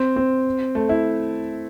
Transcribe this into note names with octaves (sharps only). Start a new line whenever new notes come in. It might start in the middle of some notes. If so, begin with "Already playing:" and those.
Already playing: C4
C4
A3
E4